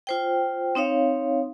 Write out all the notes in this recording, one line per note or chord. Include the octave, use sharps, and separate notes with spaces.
F4 C5 G5
C4 D#4 C#5 F5